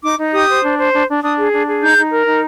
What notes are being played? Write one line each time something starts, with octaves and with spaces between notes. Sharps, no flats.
D#4 D6
D#4
G4 D#6
C5
D4
C5
D4
D4
D4 D#6
G#4
D4
G#4
D#4 G6
D#4
A#4
D#4